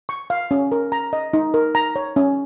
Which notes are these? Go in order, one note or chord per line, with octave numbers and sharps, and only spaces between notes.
C#6
F5
C#4
A#4
A#5
D#5
D#4
A#4
A#5
C#5
C#4